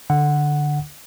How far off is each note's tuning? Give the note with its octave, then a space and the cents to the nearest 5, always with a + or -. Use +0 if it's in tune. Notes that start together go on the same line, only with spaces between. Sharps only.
D3 +5 F#5 +0